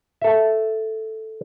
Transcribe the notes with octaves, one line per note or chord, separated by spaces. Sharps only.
A4 E5